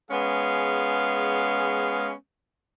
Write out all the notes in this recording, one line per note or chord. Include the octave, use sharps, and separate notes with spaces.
G#3 B3 C#4 G#4 F5